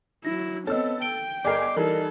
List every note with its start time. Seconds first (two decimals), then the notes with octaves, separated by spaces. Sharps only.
0.25 F#3 E4 A#6
0.67 B3 C4 A4 C#5 D#5 E6
1.02 G5 D7 G7
1.45 G1 G#4 A#4 D5 D#5 D6 C7
1.76 E3 G3 D#4 A4 A#4